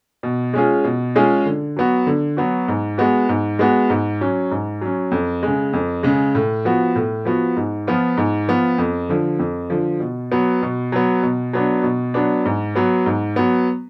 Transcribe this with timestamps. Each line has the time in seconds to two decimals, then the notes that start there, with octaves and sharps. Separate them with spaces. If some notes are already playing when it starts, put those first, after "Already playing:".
0.23 B2
0.54 G#3 C#4 F4 G#4
0.84 B2
1.15 G#3 C#4 F4 G#4
1.46 D3
1.77 F#3 B3 F#4
2.07 D3
2.37 F#3 B3 F#4
2.68 G#2
2.98 G#3 B3 F#4
3.29 G#2
3.59 G#3 B3 F#4
3.90 G#2
4.21 F#3 C#4
4.51 G#2
4.81 F#3 C#4
5.12 F2
5.43 C#3 G#3
5.73 F2
6.03 C#3 G#3
6.35 A2
6.65 F3 B3 F#4
6.96 A2
7.25 F3 B3 F#4
7.57 G#2
7.87 F3 B3 F4
8.17 G#2
8.48 F3 B3 F4
8.78 F2
9.09 D3 F3
9.39 F2
9.70 D3 F3
10.00 B2
10.32 F#3 B3
10.62 B2
10.92 F#3 B3
11.23 B2
11.53 F#3 B3 D4
11.83 B2
12.14 F#3 B3 D4
12.46 G#2
12.75 F#3 B3
13.06 G#2
13.36 F#3 B3